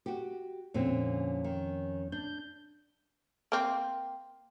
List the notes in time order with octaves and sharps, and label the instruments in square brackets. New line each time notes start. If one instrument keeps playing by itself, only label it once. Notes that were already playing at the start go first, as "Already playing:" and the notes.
[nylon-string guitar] F#4 G4
[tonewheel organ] F2 C#4 [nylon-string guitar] A#2 D3 C4
[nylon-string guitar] D#3
[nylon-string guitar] D4 [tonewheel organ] G6
[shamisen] A#3 C4